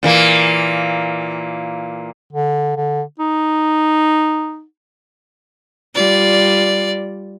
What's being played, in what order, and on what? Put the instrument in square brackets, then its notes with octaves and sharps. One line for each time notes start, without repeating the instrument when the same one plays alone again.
[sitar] A#2 E3 A#3
[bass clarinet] D3
D3
D#4
[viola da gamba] G3 F4 [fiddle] D5